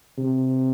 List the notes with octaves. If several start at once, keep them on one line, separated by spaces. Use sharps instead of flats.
C3